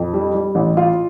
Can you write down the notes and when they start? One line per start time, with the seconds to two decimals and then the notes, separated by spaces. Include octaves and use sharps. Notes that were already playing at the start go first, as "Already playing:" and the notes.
Already playing: F2
0.14 G3
0.35 G3
0.55 A1
0.77 F4